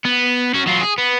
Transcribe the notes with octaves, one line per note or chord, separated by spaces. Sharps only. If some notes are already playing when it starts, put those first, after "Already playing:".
B3
C#4 F#4
F#3 F4
G#4
B3